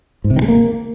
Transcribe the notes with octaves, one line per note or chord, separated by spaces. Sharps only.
G#2
C3
D#3
G#3
A#3